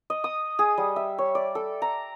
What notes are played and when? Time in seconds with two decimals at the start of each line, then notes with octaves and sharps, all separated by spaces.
0.10 D#5
0.24 D#6
0.59 G#4
0.78 G3
0.96 E5
1.18 C#5
1.35 D5
1.55 A4
1.82 A#5